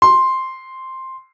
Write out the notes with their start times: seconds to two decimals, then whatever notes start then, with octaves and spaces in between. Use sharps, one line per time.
0.02 C6